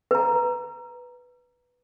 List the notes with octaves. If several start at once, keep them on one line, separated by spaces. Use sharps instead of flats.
B4 A#5